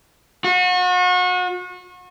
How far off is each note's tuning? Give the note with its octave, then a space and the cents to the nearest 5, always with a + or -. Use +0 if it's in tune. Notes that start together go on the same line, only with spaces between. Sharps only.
F#4 -35